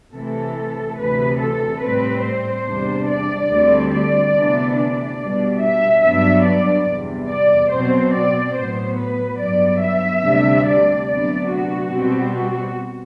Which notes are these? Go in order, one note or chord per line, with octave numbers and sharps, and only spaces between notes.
C3 E3 A3 A4
D2 C3 E3 B4
A4
A2 G3 C4 B4
C5
E2 C3 G3 D4
D5
D2 D3 G3 C4
D5
D2 C3 E3 B3 D4
D5
B2 G3 D4
E5
G2 F#3 B3 D4 E5
D5
E2 C3 G3
D5
B2 F#3 C4 C5
D5
A2 F#3 B3 C5
B4
G2 F#3 B3 D5
E5
D2 C3 G3 D4
D5
D2 C3 F#3 B3 D4 D5
F#4
B2 G3 C4
F#4